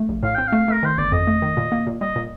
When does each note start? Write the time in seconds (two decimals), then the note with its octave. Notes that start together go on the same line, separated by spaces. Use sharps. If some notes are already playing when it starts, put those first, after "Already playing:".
Already playing: A3
0.09 A#1
0.23 A2 F5
0.35 C4 G5
0.47 A3 F5
0.68 A3 A#4
0.83 D#3 C5
0.98 G1 D5
1.12 F2 D#5
1.27 A3
1.42 D#3
1.57 A#2
1.72 A#3
1.87 A#2
2.01 G3 D#5
2.16 A#2